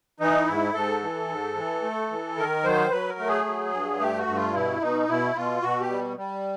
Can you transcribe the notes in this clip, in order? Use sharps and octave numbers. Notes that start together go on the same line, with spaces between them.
E3 D#4
G#2 E4
G#2 A4
E3
G#2
E3
A3
E3
D#3 A#4
F#3 C5
F#3 B4
A#4
A3
G#4
F#3
G2
A3 G4
F#4
G2
F4
B2 E4
B2 D#4
B2 E4
B2 F4
B2 F#4
G4
G3
G3